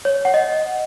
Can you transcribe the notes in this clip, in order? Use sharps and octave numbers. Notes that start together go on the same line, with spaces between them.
C#5
F#5
D#5